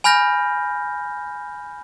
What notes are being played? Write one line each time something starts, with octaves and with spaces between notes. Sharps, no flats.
G#5 B5 F6 G6 A#6